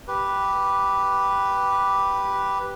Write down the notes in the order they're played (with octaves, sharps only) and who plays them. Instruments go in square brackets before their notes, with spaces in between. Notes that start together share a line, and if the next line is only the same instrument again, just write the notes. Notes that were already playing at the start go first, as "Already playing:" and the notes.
[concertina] G4 B4